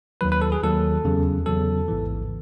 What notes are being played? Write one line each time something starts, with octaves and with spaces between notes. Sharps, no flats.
D#2 D#3 F#3 B4
B4
A4
G#4
D#2 D#3 F#3 A4
E2 C#3 F#3
E2 C#3 F#3 A4
A1 G#2 E3